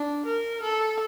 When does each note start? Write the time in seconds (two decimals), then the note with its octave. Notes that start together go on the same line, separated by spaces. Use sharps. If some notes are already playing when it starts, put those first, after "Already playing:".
Already playing: D4
0.25 A#4
0.62 A4